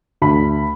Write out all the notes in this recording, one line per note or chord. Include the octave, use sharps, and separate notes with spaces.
D2 B5